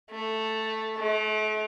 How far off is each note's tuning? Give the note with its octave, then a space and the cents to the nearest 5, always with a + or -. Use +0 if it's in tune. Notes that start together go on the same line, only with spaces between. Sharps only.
A3 +0
A3 -40